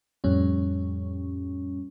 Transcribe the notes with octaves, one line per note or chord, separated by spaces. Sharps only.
F2 A2 G3 C#4